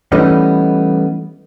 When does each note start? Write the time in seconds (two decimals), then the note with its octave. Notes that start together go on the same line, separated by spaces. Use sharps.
0.12 E3 G3 A3 B3 C#4 D#4